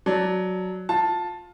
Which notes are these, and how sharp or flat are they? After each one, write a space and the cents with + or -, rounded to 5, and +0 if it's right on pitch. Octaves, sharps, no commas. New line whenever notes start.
F#3 +0 D5 +0 A5 +0
F4 +20 A5 +0